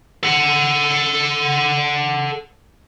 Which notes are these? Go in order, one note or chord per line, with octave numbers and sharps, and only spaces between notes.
A4 F#5